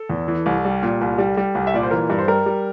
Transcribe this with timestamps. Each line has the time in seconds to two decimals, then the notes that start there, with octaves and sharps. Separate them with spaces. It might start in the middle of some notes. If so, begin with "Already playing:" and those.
Already playing: A4
0.10 E2
0.28 E3
0.46 C2
0.65 G3
0.83 A#2
1.01 C2
1.18 G3
1.37 G3
1.55 C2
1.67 E5
1.74 A#2 D5
1.83 C5
1.91 E3 A#4
2.10 G2
2.19 C5
2.28 G3 A#4
2.46 G3